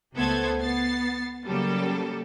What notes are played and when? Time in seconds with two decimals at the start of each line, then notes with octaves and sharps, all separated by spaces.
0.15 C#2 A3 B3 A4 C5 G#6
0.61 B3 A6 C7
1.46 C#3 F#3 G3 A#3 A4